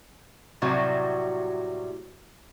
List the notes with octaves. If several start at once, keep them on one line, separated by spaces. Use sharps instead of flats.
A2 C3 F#3 G3 F#4